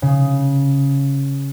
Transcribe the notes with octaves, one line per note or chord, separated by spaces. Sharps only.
C#3